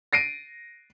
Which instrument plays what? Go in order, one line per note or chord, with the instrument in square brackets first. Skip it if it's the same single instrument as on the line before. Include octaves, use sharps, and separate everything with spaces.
[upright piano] A#6 C7 D7 D#7